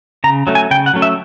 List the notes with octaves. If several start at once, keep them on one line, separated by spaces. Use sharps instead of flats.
C#3 A#5
F#3 A3 C#4
G#5
C#3 G5
F#5
F#3 A3 C#4
E5